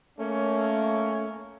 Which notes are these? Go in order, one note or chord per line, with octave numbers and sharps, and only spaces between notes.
A3 A#3 C#4